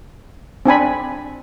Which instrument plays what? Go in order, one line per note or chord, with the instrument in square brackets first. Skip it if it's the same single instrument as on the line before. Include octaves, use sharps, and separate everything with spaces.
[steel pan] C4 D4 G#5 B5